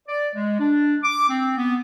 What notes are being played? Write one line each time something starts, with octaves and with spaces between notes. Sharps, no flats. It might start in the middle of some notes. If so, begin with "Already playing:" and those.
D5
G#3
D4
D6
C4
B3